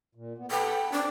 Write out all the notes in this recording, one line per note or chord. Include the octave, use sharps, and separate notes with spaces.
A#2
B3
A4 B4 F#5 G5
C4 D4